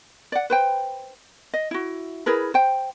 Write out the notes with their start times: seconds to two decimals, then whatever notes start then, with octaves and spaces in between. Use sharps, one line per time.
0.32 D5 F#5
0.50 B4 C5 G5
1.54 D#5
1.71 E4 F#4
2.26 E4 G#4 A#4 B4
2.54 C5 G5